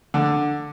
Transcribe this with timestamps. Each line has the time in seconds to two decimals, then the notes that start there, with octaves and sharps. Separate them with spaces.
0.14 D3